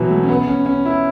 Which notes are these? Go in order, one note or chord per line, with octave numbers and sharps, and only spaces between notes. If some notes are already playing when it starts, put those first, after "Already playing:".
Already playing: B2 E3 F#3
A3
C#4
B3
C#4
C#4
E4